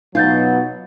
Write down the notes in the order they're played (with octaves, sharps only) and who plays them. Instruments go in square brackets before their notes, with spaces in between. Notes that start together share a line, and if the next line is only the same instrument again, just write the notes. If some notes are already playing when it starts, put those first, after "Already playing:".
[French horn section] B2 F#3 [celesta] D#4 G6 A6 [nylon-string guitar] F4